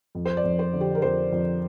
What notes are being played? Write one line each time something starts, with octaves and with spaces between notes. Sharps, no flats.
F2
C5
D5
F2
C5
D3
G4
A#4
F2 C5
F2